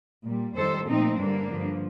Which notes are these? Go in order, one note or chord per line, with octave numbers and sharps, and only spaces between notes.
A#2 G3
F2 D#3 G3 A4 C5
A#2 F3 A3 C4 D#4
G2 D3 G3 A#3 D4
G2 D3 F3